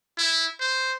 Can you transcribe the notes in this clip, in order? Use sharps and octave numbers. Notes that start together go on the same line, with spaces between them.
E4
C5